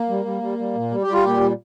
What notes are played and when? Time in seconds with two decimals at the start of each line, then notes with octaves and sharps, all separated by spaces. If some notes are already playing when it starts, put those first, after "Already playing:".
Already playing: A#3
0.09 G3
0.25 G3
0.42 G3
0.59 G3
0.75 A#2
0.91 G3
1.02 G4
1.07 G3
1.13 F4
1.23 A#2 G4
1.41 G3